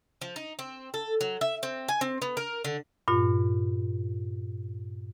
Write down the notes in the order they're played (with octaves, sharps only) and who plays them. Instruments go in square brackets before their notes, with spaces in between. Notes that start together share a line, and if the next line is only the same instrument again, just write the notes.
[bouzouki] F3
D#4
C4
A4
F#3
E5
C4
G#5
C4
B3
A#4
D3
[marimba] G2 A#2 F4